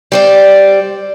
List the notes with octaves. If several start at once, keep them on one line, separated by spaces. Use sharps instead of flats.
G3 C5 D5